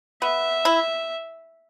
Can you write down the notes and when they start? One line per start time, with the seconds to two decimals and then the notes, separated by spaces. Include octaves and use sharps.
0.22 B3 E5
0.65 E4